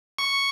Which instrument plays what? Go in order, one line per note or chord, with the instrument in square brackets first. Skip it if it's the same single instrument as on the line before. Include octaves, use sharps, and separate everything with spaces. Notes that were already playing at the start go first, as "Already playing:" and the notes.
[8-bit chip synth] C#6